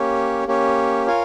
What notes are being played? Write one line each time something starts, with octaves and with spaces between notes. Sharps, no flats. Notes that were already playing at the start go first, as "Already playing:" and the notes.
Already playing: A#3 C#4 G4 C#5
A#3 C#4 G4 C#5
F4 A#4 C#5 F5 G#5